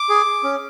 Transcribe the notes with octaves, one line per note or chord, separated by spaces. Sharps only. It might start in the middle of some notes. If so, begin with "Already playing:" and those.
Already playing: D6
G#4
C#4